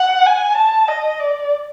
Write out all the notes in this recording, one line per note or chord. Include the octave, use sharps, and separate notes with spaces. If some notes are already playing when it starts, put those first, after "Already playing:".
Already playing: F#5
G#5
A5
D#5
D5